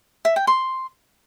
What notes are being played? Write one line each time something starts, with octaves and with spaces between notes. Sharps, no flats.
E5
G5
C6